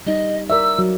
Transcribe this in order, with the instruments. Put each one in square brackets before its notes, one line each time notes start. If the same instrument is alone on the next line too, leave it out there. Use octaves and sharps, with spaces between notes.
[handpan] G3 D#4 [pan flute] D#5
[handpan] A#4 D5 E5 [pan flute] E6
[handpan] F#3